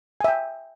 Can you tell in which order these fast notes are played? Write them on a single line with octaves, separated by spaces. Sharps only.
G#5 E5 G5